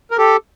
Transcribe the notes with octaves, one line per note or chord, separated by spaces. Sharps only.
A#4
G4 A4